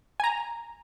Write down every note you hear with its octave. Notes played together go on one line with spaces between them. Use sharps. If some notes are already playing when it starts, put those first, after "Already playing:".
G#5 A#5